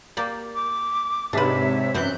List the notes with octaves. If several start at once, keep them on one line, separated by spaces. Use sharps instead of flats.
A#3 G4 D5
D6
G#2 C3 D4 B4 C#5 E5
F#2 E3 C4 C5 F#6 G6